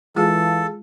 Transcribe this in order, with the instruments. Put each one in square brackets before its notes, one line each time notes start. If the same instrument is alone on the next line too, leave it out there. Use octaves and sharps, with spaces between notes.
[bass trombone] E3 [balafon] G#3 F4 [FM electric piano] G#4 F5 A5 [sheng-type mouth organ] A4